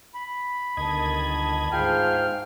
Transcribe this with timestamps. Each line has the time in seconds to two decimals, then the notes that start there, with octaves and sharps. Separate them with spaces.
0.15 B5
0.77 G1 D2 D#3 D#5 A5 G#6
1.72 G#2 F4 G#4 F5 G5 F6